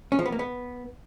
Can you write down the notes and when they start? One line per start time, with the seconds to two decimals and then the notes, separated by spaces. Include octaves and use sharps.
0.12 C#4
0.19 F3
0.26 B3
0.32 A#3
0.39 B3